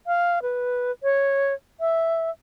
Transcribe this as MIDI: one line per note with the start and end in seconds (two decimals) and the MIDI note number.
0.07 0.42 77
0.42 0.91 71
1.03 1.53 73
1.80 2.30 76